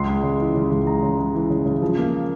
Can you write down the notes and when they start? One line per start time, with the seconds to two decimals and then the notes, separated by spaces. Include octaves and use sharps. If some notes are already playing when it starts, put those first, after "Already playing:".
Already playing: C#2 C6
0.08 G#3
0.23 C#3
0.40 E3
0.55 C#3
0.72 C#2
0.87 G#3 A#5
1.03 C#3
1.19 G#3
1.35 E3
1.50 C#3
1.66 C#3
1.82 F3
1.98 A#3